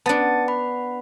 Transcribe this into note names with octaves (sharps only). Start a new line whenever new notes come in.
B3 D4 A5 A6 C#7
F#5 B5